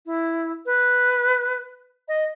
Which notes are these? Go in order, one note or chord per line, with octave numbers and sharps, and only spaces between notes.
E4
B4
D#5